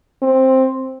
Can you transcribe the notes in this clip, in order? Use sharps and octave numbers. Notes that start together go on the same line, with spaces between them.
C4